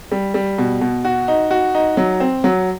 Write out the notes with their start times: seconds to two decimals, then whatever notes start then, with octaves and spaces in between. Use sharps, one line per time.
0.12 G3
0.34 G3
0.58 B2
0.81 B2
1.05 F#4
1.28 D#4
1.51 F#4
1.75 D#4
1.97 F#3
2.20 C4
2.44 F#3